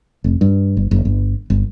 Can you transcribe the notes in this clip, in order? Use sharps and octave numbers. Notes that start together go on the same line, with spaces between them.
F1
G2
G1
F#1
G1
G1